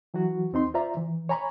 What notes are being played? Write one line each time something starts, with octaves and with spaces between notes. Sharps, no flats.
E3 F#3 E4 F#4
D#2 C4 D#4 C6
F4 C5 D5 E5 A#5
E3
C#5 G#5 A#5 B5 C#6